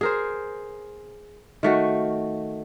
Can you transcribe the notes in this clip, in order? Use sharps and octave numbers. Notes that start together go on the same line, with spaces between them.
G#4 A#4 C5
D#3 A3 F#4